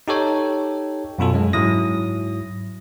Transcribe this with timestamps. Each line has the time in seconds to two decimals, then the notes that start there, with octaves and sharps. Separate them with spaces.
0.08 D#4 G4 A4 C#5 G5
1.19 F#2 B2 F4 A4
1.34 F#2 G#3
1.53 G#2 F#3 E4 D#6 A#6